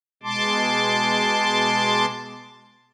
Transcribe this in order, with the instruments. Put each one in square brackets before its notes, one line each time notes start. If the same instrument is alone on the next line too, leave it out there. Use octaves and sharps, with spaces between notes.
[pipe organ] B2 G#3 A5 C6 D6